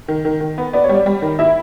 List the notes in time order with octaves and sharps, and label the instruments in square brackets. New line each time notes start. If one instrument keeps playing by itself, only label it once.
[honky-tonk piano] D#3
D#3
D#3
B3
[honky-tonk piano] B3 [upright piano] D5
[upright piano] C#5
[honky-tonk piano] G3
[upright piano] D5
[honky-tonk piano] G3
D#3
[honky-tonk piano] E4 [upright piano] E5